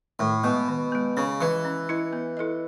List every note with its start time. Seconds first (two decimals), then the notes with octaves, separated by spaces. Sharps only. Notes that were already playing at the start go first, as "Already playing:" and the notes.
0.19 A2 D#3
0.44 B2 G#3 B3
0.69 D#3
0.92 G#3 B3
1.17 C#3 C#4
1.41 E3 E4 B4 D#5
1.65 C#4
1.89 E4 B4 D#5
2.13 B3
2.37 E4 A4 D#5